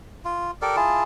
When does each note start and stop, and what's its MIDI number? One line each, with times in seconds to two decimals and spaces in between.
0.25 0.51 65
0.62 0.76 67
0.62 0.76 69
0.62 0.76 70
0.62 0.76 74
0.76 1.03 64
0.76 1.03 65
0.76 1.03 68
0.76 1.03 81